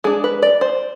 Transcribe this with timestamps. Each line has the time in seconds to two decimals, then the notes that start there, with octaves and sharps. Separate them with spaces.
0.04 G#3 D4 G#4
0.24 B4
0.42 D5
0.61 C5